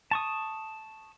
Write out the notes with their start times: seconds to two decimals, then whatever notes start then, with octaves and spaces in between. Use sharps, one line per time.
0.11 A5 C#6 D#6